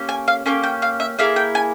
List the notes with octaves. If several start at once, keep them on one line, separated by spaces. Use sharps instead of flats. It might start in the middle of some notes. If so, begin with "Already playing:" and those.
Already playing: A#3 C#4 G4
G#5
F5
A#3 C#4 G4 G#5
G5
F5
E5
A#3 E4 G#4 F5
G5
G#5